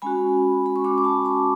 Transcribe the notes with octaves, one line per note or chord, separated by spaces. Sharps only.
G#3 C#4 F#4 G#5 B5
B5
C#6
G#3 C#4 F#4 B5 D6
D6
A5 C#6
B5 D6